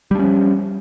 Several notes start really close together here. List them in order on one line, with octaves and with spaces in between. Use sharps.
G3 D4 C#4 F3